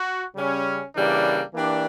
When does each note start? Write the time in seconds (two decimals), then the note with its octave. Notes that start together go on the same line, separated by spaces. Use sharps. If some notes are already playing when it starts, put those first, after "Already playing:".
Already playing: F#4
0.36 C#3 G3 C#4
0.95 C#3 E3 G3 A#3 D4
1.54 E3 A#3 D4 G4